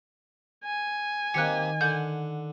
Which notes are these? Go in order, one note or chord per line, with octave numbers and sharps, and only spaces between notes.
G#5
D#3 A#3 C4 G4 F#6 C#7
D3 F#5 G6